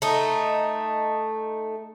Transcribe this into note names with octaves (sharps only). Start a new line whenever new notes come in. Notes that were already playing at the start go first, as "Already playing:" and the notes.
A3 D#4